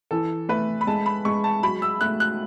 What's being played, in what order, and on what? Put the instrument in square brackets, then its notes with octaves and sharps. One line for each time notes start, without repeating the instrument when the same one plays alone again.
[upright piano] E3 [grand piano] A4
[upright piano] A3 [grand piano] B4
[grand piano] B5
[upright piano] G#3 [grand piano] A5
[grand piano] B5
[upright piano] G#3 [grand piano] C#6
[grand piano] A5
[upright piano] F#3 [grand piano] B5
[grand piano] E6
[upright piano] A3 [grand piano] F#6
[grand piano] F#6